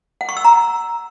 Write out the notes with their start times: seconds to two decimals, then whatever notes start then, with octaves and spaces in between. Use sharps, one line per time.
0.21 F#5
0.29 C#6
0.37 E6
0.45 A#5